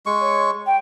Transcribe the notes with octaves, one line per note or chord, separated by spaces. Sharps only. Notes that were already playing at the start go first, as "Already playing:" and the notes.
G#3 C#6
C#5
G5